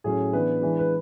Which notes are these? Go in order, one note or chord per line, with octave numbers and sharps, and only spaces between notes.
A2 F#3 C#4 G#4
E3 B3 D4 B4
E3 G#3 D4
B4